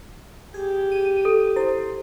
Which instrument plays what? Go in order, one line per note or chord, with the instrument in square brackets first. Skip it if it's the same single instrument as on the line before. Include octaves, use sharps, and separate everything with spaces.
[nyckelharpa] G4 [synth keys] G#4
[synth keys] D#7
[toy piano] A4
[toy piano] E4 [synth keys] C5